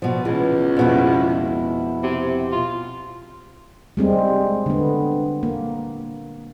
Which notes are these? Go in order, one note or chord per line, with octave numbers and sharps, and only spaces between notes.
B2 F3
C#2 E3
F2 B2 E4
C3
F4
G3 G#3 C4
D3 B3
A#3